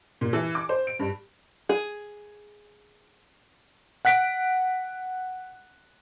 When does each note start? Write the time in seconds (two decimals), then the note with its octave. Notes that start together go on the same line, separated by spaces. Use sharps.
0.21 A#2
0.33 E3
0.55 D6
0.69 C5
0.87 D7
0.99 G2
1.69 G#4
4.05 F#5 F#6 B6 D7